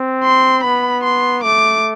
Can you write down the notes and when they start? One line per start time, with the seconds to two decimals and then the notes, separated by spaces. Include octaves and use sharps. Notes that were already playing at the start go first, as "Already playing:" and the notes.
Already playing: C4
0.24 C6
0.64 B3 B5
1.04 C6
1.44 A3 D6